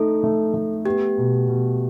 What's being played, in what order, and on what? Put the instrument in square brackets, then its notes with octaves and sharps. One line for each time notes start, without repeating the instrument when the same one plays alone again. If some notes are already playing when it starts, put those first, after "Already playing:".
Already playing: [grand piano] A3 D#4 [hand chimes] A4
[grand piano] A3
A3
[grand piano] B3 [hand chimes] G4
[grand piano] B2
B2